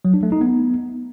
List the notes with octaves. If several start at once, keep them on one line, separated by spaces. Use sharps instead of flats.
F#3
D4
A3
D#4
B3